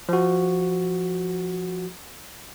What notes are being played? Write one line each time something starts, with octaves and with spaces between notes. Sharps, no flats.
F3 F#4